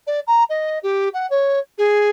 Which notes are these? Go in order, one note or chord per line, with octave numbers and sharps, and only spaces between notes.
D5
A#5
D#5
G4
F#5
C#5
G#4